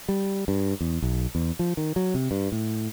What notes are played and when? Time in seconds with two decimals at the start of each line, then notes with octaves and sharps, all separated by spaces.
0.09 G3
0.48 G2
0.81 E2
1.02 B1
1.35 E2
1.59 F3
1.77 D#3
1.96 F#3
2.14 C3
2.31 G2
2.52 A2